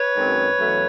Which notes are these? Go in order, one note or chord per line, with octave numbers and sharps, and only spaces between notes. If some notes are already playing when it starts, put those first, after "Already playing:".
Already playing: B4 C#5
F#2 D#3 G#3 C4
E2 B2 F#3 A3 C#4